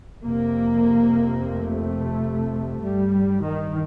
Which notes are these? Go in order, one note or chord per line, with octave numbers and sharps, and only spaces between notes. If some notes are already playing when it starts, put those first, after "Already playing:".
F2 C3 A#3
A3
G2 G3
D#3